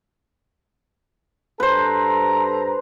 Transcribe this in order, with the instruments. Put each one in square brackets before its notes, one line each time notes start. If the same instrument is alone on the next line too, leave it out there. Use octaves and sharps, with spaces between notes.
[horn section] G2 A4 A#5 [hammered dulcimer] B4 C5